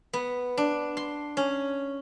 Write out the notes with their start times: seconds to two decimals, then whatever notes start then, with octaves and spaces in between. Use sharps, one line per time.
0.13 B3
0.57 D4
0.97 C6
1.37 C#4